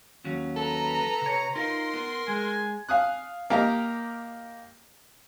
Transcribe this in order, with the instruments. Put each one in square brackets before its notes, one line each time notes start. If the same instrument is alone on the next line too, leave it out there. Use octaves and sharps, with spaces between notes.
[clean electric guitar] D#2 F#3 C#4
[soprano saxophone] A4 [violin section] B4 A#5
[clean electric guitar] C3 C#5
[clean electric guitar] D#4 F4 [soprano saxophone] A#4 [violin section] C6
[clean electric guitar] B3
[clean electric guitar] G#3 [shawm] G#5
[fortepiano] F5 G#5 D#6 F#6
A#3 G4 A#4 D#5 A#5